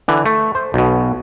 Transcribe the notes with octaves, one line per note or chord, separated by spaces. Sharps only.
D3 E3
A3
C5
B1 B2